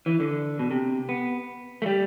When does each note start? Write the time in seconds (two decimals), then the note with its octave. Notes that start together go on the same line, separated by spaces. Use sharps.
0.06 E3
0.20 D3
0.59 B2
0.71 C3
1.09 B3
1.82 A3
1.86 G3